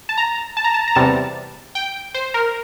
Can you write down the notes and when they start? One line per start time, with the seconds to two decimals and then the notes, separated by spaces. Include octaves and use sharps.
0.09 A5
0.17 A#5
0.57 A5
0.64 A#5
0.74 A5
0.88 A#5
0.95 E2 C3 G3 A5
1.75 G5
2.14 C5
2.34 A#4